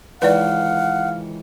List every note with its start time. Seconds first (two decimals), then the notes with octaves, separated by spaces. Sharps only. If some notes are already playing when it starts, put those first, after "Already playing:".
0.22 C#2 D#3 E3 B4 D5 F5 F#5